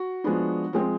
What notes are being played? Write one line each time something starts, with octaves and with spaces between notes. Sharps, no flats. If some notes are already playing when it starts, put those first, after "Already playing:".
Already playing: F#4
F3 G#3 B3 D4
F3 G#3 C4